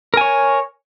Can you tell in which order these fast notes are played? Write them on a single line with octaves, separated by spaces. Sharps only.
A#4 G#5 C#5